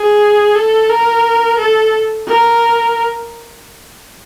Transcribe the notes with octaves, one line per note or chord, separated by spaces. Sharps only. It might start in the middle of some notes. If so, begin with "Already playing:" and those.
Already playing: G#4
A4
A#4
A4
A#4